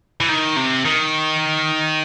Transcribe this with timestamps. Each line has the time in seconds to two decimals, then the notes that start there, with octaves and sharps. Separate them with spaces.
0.20 E3
0.29 D#3
0.56 C3
0.85 D#3